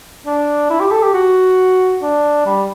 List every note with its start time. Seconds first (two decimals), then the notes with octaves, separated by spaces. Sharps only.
0.26 D4
0.70 E4
0.80 G4
0.91 A4
1.03 G4
1.14 F#4
2.02 D4
2.46 G3